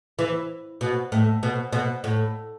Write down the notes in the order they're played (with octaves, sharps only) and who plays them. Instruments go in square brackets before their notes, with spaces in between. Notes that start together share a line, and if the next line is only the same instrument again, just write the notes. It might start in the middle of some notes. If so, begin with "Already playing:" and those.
[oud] E3
B2
A2
B2
B2
A2